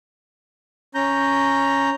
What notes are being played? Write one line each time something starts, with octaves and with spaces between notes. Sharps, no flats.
C#4 A#5 G6